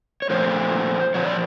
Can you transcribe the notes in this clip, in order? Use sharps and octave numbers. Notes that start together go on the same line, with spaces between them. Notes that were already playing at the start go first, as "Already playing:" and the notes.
C#5
A#2 F3 A3 C5
A#2 F3 C#5
D5